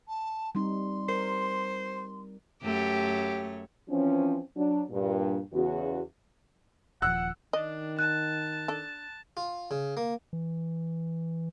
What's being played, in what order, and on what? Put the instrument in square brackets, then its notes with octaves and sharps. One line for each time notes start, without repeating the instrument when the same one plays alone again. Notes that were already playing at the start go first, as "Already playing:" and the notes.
[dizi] A5
[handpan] G3 C4 D#4 [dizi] C6
[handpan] A#4 [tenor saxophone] C5
[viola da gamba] F#2 A3 C#5 [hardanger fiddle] G4
[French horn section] E3 F3 C4 C#4
F#3 D4
G2 A#2
E2 C#3 F#4
[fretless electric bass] D#1 F3 [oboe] F#5 [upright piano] E6 F#6
[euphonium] D#3 [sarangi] D4 [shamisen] D#5
[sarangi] A5 [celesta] F#6
[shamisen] D4 A4
[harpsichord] F4
C#3
A#3
[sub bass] E3